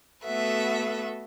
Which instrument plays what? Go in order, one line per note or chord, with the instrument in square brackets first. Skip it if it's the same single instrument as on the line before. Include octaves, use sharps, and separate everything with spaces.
[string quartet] A3 B3 F#4 A4 B4 E5